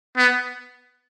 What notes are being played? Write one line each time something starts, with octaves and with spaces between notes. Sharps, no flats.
B3